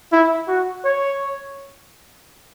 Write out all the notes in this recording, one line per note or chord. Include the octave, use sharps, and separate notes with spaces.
E4
F#4
C#5